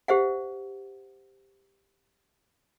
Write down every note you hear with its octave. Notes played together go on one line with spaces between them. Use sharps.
G4 C5 E5 F#5